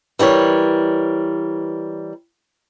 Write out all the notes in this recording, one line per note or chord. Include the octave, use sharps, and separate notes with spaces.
E3 G3 A#4 C#5